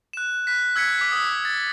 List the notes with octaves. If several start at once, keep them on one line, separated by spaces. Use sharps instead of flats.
F#6 E7
F#6 B6
E6 G#6 B6 C#7
D6 B6
D#6 E6
A6